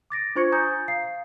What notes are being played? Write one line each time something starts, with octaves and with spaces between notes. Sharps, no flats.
D6 A6 A#6 D7
D4 F4 C5 C#6 G#6 C#7
G#5 A#5 D#6 G6 A6
F5 C7